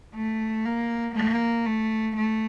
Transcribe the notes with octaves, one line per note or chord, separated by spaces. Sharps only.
A3
A#3
A#3
A3
A3